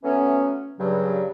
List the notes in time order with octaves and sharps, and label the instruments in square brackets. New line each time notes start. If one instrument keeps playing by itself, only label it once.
[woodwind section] E3 F#3 A3 B3 C#4
G2 C#3 F#3